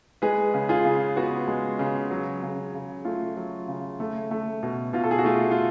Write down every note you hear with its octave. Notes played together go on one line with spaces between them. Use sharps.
G#3 G#4 B4
C#3
F4 G#4
C#3
B3 F#4
G#3
C#3
F#3
C#3
C#3
A3 F4
F#3
C#3
A3
A3
B2
B2 F4
A4
G#4
F#4
A3 F4
F4